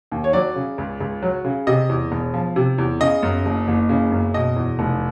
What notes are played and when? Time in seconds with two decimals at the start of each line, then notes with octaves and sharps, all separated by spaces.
0.12 D#2
0.24 C#5
0.33 F#3 D5
0.56 C#3
0.78 C#2
1.00 C#2
1.22 F#3
1.45 C#3
1.67 C3 D#5
1.89 E2
2.12 E1
2.34 F3
2.56 C3
2.78 E2
3.00 C#3 D#5
3.23 F#2
3.45 F#1
3.68 F#1
3.89 C#3
4.12 F#2
4.34 B2 D#5
4.56 E2
4.79 F1